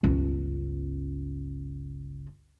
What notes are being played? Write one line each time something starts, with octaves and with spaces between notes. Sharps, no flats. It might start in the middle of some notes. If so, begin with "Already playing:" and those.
G1 C#2